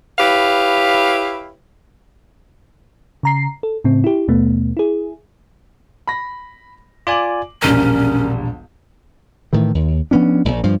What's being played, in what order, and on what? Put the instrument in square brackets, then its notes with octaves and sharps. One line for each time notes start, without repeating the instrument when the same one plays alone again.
[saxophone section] E4 G4 B4 C#5 F5
[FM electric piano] C#3 A#5 C7
A4
A2 C#3 C4
E4 G4
D#2 B2 A3 B3
E4 G#4
[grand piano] B5 A#6
[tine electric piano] F4 D5 G#5 [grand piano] D6 F#7
[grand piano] E1 A#1 G3 [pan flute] C#4 [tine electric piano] A#4
[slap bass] A2 D#3 E3
D#2
F3 B3 C#4 D4
E1 A#1
G2 F3